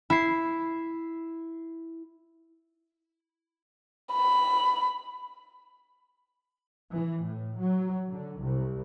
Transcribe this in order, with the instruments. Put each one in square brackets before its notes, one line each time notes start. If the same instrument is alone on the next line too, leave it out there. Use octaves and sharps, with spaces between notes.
[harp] E4 C7
[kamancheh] B5
[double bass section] E3
A2
F#3
D3
C2